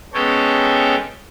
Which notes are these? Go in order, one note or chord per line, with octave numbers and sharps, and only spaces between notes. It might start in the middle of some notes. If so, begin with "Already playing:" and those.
G#3 B3 C#4 A4 C#5 G5